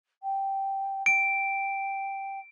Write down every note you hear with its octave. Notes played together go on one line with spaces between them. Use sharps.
G5
G5 D7